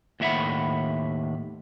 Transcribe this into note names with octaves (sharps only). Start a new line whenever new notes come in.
D#2 A2 E4 E5 F#5 B5